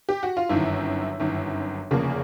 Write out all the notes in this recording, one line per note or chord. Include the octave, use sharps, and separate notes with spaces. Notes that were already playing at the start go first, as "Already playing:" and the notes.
G4
F#4
F4
G1 F#2 D#3 E4
G1 F#2 D#3
F1 E2 C#3 F3 A#3 G#4